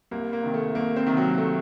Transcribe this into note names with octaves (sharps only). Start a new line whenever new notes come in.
C2 A#3
A#3
C3 D#3
A3
C2 A#3
C4
C3 D#3
F#3
A3